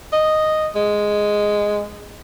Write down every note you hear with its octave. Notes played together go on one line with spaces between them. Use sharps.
D#5
G#3